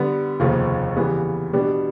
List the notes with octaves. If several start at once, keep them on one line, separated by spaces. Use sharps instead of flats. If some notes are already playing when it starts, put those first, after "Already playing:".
Already playing: D3 G3 B3
F1 D#2 C#3 F3
C#3 E3 G3 B3
B2 G3 B3 D4 G4